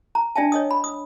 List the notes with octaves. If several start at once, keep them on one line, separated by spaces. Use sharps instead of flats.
A#5
D4 D5 E5 G5 A5
C#5 D#5 D#6
B5
D#6